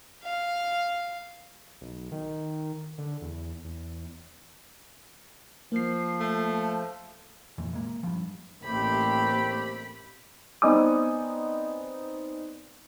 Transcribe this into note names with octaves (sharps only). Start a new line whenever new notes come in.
F5
B1
D#3
D3
E2
E2
F3 A#3 C7
A3
F2 A#2 E3
A#2 G#3 A#3
G2 F3
A1 A3 A#3 C4 G4 B5
B3 C4 D#4 D5 G#5 D#6